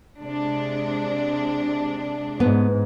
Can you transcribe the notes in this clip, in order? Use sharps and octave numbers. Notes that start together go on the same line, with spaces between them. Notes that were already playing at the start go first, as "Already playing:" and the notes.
C3 G#3 D4
G#2 B3